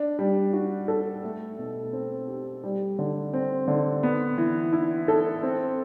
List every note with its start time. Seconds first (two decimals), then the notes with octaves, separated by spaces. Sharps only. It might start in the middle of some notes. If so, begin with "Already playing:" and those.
Already playing: D4
0.19 G3
0.53 F#4
0.88 A4
1.24 A3
1.59 B2
1.93 C4
2.28 G4
2.64 G3
2.99 D3
3.34 C4
3.68 D3
4.03 B3
4.38 E3
4.73 E4
5.08 A4
5.43 C4